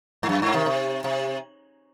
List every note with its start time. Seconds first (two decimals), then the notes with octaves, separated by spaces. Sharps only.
0.23 G#2
0.29 F#2
0.42 G#2
0.54 C3 D#3
0.66 C3
1.04 C3